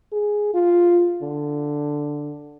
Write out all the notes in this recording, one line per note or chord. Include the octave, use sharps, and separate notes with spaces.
G#4
F4
D3